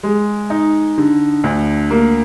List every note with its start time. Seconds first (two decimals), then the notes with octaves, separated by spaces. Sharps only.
0.03 G#3
0.50 D#4
0.98 D3
1.44 D2
1.91 A#3